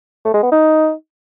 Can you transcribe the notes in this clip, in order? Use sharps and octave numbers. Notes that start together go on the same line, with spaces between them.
A3
G#3
B3
D#4